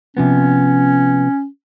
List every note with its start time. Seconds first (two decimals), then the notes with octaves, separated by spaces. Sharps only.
0.17 C3 F3 B3 C#4